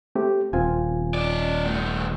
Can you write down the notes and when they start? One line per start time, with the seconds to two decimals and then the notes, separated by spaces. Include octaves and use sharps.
0.15 A3 C4 G4
0.53 D#1 C4 F4 G#5
1.14 C#4 D5
1.65 D#3 A3